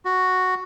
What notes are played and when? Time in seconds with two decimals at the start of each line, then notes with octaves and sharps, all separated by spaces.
0.05 F#4